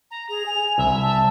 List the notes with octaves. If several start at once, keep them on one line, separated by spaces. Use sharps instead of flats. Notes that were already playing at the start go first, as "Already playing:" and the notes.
A#5
G#4 F7
G#5
C2 E5
A5